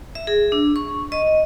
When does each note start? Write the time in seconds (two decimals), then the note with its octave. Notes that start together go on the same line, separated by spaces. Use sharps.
0.15 E5
0.27 G#4
0.52 D4
0.76 C#6
1.12 D#5